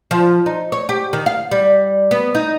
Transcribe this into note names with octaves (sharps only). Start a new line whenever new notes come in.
F3
D#4
C#5
G4
D#3
F5
G3
B3
D#4